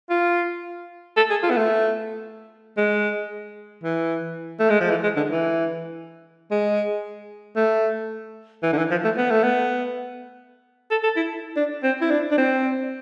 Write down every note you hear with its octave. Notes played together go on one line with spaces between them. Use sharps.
F4
A4
G#4
F4
B3
A3
G#3
E3
A3
G#3
F3
E3
G#3
D3
E3
G#3
A3
E3
D3
E3
F3
A3
B3
A3
B3
A4
A4
E4
D4
C4
E4
D4
D4
C4